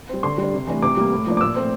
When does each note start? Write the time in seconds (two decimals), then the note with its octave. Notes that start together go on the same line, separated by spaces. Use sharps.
0.09 G3 C4
0.23 D3 C6
0.38 G3 D4
0.53 C3
0.67 E3 A3 D4
0.82 C3 D6
0.97 G3 A#3
1.12 A2
1.26 F3 A#3 D4
1.37 D6
1.41 A#2 E6
1.55 A3 C4